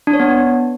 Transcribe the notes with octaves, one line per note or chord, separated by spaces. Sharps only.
D4
C#5
B3